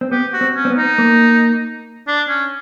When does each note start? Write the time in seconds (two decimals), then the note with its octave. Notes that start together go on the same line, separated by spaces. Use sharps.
0.01 C4
0.11 B3 G4
0.33 F#4
0.41 C4
0.56 C#4
0.65 C4
0.70 B3
0.77 D#4
0.98 A#3
2.07 D4
2.28 C#4